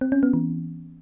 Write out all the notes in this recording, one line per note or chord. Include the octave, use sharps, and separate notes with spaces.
C4
C#4
B3
E3